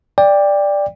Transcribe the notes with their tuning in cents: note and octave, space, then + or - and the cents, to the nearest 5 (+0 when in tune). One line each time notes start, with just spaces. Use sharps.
D5 +0 G5 +20